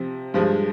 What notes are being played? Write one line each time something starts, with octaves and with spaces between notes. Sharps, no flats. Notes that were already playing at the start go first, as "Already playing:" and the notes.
Already playing: C3 F3 C4
G2 F3 G#3